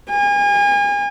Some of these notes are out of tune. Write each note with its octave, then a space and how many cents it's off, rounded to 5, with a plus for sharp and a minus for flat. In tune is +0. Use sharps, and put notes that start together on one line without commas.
G#5 -35